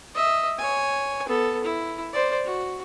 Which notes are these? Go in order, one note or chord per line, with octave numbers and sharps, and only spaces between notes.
D#5 E5
C#5 G#5
B3 A4
E4
C5 D5
F#4